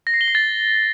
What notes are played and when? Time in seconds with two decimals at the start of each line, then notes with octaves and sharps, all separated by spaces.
0.07 A#6
0.14 C7
0.21 G7
0.28 C7
0.35 A6